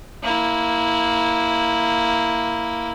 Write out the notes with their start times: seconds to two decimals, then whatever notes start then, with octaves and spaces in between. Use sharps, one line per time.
0.23 A#3 E4